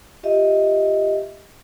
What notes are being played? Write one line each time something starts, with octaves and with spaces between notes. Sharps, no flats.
F4 G4 D#5 E5